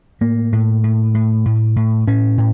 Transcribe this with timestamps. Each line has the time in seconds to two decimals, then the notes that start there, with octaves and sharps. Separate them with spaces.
0.21 A2 A#3
0.53 A2
0.84 A2
1.14 A2
1.46 A2
1.76 A2
2.07 A2 C#4
2.38 A2